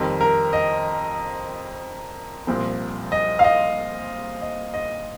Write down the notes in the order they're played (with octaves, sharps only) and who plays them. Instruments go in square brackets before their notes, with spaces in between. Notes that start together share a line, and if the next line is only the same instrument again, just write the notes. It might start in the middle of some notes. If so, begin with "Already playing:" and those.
Already playing: [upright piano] F2 D#3 G3 C4 A#4
A#4
D#5
C2 A#2 F3 C4
D#5
F5
D#5
D#5
D#5